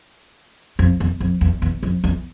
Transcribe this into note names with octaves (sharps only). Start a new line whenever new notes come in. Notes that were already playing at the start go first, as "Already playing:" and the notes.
F2
E2
F2
E2
E2
F2
E2